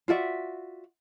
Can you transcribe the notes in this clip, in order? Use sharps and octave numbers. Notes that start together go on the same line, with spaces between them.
F4 F#4 D5 E5